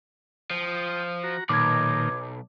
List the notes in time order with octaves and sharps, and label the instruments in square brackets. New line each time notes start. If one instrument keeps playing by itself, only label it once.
[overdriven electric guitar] F3 [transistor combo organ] G5 D#6
[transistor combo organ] F#4 A#5
[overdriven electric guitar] B1 [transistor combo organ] A#2 D#3 [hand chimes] D6 G#6